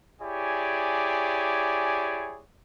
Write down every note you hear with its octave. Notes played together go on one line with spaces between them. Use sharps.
E4 G4 G#4 C#5 D5 G#5